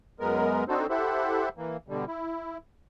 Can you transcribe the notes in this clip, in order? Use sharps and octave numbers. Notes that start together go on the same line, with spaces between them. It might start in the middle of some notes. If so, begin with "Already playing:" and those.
F#2 G#3 B3 A#4
C4 D4 D#4 F#4 A4 C5
E4 G4 A4 C5 E5 F#5
E3 A#3
B2 D3 G3
E4